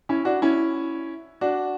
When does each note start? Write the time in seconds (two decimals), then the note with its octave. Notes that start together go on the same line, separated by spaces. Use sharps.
0.09 C#4 E4
0.25 D4 F#4
0.42 C#4 E4
1.41 D4 F#4